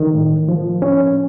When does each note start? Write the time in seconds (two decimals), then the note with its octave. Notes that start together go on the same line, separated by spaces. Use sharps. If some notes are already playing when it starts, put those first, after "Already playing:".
Already playing: D#3
0.14 A2
0.48 F3
0.82 C#4